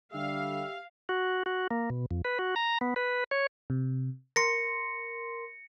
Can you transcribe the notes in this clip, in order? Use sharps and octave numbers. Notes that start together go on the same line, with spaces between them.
D3 G3 G4 E5 F5
F#4
F#4
A#3
B2
F2
B4
F#4
A#5
B3
B4
C#5
C3
A#4 C6 A#6 C#7